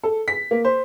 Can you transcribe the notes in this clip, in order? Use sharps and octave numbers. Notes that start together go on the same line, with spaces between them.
A4
B6
A#3
C5